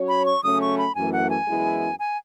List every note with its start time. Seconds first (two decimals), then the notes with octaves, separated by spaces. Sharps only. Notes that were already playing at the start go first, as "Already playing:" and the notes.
Already playing: F#3 C#4 F#4 C#5
0.08 B5
0.25 C#6
0.43 C#3 F#3 A3 C#4 D#6
0.61 C#6
0.78 B5
0.95 F#2 E3 A3 G#5
1.13 F#5
1.30 G#5
1.47 F#2 E3 G#3 B3 E4
1.99 G#5